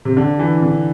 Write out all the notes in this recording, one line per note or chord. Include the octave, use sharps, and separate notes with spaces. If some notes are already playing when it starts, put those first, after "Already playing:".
C3
D3
E3
D3